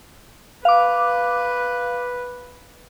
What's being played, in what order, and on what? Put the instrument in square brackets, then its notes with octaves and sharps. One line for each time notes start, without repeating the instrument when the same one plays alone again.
[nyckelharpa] B4 [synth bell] F5 D6